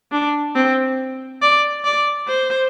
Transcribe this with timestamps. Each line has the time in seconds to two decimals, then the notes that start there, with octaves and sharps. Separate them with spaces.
0.12 D4
0.55 C4
1.42 D5
1.85 D5
2.28 C5